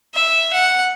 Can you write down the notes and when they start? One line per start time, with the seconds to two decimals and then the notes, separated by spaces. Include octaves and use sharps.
0.14 E5
0.53 F#5